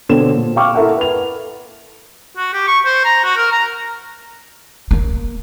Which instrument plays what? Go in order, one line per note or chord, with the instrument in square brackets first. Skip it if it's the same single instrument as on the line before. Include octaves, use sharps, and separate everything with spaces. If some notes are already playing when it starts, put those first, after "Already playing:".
[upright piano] B2 D3 C4 A4 C#5 E7
A#2
F5 G5 C#6 D6 F6
E4 A4 A#4 E5 F#5
B4 F7
[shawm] F#4
G4
C#6
C5
A#5
F#4
A#4
A#5
[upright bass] A#3